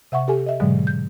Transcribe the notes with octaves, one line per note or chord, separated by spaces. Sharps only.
C3 E5 F#5 C#6
G4 A4 G#5
D#5 E5
G#2 B2 D3 F#3 G#3
G6